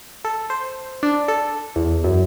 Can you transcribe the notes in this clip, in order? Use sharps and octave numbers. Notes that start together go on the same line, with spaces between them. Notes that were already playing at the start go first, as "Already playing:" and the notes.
A4
C5
D4
A4
E2
F#2